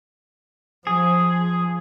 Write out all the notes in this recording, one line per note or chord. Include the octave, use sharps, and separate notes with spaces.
F3 G#4